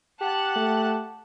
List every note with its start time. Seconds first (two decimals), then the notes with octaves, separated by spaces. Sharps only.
0.21 G4 F#5 A5 F#6
0.56 A3